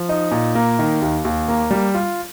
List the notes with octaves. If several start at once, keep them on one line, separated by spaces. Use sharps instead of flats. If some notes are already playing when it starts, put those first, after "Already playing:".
Already playing: F3
D#4
A#2
A#3
D#3
D#2
D#2
A#3
G3
F4